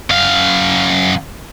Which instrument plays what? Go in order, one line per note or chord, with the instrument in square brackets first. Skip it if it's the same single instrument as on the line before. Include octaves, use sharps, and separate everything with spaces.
[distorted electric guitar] F#2 F5